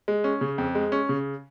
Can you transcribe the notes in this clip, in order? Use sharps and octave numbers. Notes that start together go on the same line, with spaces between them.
G#3
C#4
C#3
F2
G#3
C#4
C#3